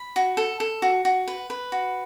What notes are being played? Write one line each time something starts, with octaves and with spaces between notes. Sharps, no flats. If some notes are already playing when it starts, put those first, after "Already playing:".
Already playing: B5
F#4
A4
A4
F#4
F#4
B4
B4
F#4